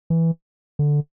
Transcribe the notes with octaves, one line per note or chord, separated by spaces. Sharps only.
E3
D3